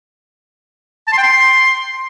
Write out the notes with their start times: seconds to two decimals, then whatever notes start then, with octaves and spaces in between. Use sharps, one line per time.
1.07 A5
1.12 C6
1.18 G5
1.23 C6